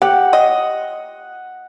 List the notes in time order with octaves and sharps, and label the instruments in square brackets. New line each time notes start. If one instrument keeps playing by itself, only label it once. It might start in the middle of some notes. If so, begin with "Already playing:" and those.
[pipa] G4 [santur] F#5
[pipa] D#5